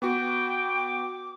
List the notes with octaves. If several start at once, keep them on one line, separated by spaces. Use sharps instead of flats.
B3 F#4 G5 D6